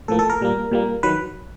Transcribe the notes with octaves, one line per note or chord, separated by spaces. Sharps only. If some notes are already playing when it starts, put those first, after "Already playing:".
A2 F3 A#3 A4
A4
A#4
A#2 G3 A#3
A#2 G3 A#3
D#3 F#3 B4